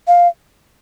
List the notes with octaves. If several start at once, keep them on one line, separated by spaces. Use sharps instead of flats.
F5